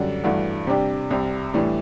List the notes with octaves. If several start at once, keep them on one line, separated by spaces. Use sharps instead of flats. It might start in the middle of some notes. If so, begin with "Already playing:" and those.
Already playing: F#2 D3 G3 D4 F#4
G2 E3 A3 D4 F#4
C3 G3 D4 G4
C2 C3 G3
A2 E3 G3 D4